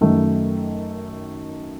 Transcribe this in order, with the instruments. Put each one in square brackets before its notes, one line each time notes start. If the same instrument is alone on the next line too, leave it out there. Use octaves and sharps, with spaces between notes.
[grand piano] F#2 D#3 A3